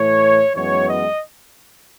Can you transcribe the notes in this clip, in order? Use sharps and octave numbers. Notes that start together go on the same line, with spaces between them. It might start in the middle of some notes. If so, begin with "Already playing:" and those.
Already playing: A2 E3 A3 C#5
F#2 E3 G#3 B3 C#5
D#5